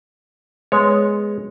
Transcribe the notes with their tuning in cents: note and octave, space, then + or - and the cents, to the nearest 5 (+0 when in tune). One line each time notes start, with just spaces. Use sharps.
G#3 +0 B3 +0 C#5 +0